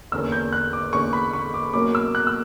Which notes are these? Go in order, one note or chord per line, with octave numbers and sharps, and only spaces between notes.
E2 D3 A#3 C#4 E6
G6
F#6
D6
E2 D3 A#3 C#4 C#6
B5
C#6
D6
B2 F#3 A#3 C#4 D6
E6
F#6
E6